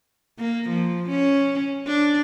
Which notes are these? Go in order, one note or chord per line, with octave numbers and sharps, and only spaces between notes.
A#3
F3
C#4
D4